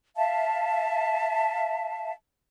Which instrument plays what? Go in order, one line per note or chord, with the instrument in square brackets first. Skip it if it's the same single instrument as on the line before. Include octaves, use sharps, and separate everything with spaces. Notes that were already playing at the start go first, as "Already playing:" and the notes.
[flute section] E5 F5 A5